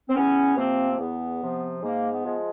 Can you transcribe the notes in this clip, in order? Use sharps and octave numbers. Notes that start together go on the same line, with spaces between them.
C4
E2 B3 C#4
C3 F3 A#3 C4
A#3
E2 B3
C3 F3
G#2 A#3
B3
F3 G#3